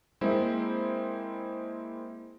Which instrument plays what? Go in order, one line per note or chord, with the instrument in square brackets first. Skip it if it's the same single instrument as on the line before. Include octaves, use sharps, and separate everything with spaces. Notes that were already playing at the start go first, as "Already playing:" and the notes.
[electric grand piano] G#3 A#3 C4 E4 C5